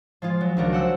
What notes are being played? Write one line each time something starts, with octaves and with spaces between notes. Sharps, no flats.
F3 G#3 F4
F#3
C#2 D#3 D4 F#4 A#4
C5 F#5 E6